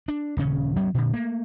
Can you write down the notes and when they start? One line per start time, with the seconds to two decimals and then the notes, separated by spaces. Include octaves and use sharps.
0.08 D4
0.37 D#1 C#3 C#4
0.76 D2 F#3 B3 C#4
0.94 A#2 D3
1.14 A3 A#3